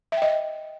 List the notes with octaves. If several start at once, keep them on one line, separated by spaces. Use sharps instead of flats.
D#5 E5 G5